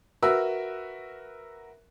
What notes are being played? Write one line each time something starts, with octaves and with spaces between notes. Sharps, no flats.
F#4 A#4 B4 E5 E6